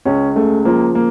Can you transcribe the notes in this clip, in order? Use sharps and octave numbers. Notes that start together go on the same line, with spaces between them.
C#2 C#4
C#3 A3
F3 A#3
A#3